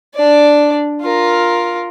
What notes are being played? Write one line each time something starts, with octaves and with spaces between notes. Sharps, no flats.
D4 D5
F4 A#4